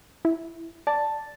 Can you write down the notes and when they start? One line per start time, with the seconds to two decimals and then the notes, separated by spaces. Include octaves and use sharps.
0.25 E4
0.87 D5 A5